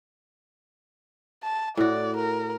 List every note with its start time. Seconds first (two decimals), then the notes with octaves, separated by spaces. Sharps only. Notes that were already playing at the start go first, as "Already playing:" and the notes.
1.43 A5
1.77 A2 F#4 D5
2.17 A#4